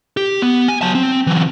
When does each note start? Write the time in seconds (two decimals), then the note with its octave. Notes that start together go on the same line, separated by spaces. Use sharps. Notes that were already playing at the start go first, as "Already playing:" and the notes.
0.17 G4
0.42 B3
0.68 G#5
0.82 F#3 A5
0.95 C4
1.27 E3 F#3